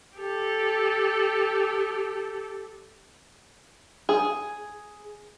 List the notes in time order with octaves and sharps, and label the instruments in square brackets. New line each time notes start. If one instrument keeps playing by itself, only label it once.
[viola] G4 A4
[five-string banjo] G#4